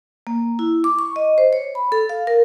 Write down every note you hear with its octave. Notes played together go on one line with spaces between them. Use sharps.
A#3
E4
D6
C#6
D#5
C5
C#5
B5
A4
F5
A#4